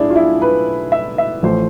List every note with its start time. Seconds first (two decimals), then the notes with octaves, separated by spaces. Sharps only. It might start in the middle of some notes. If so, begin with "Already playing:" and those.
Already playing: B1 A2 D4 E4 G#4
0.10 F4
0.15 E4
0.42 B4
0.92 E5
1.18 E5
1.43 A1 A2 F3 A3 C5